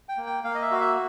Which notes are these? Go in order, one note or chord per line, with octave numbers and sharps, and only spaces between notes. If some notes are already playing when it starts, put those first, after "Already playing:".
G5
A#3
G5
A#3 F5
D#5
E5
F#4 F5
E5